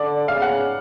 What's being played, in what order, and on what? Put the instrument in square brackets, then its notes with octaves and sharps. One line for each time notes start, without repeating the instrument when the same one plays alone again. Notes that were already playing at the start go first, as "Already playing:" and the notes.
Already playing: [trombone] D3 [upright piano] D5
[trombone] C#3 [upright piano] F5
[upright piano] F#5